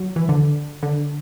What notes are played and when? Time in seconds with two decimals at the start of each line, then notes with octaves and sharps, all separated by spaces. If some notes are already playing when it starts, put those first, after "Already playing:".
Already playing: F#3
0.16 E3
0.29 D3
0.83 D3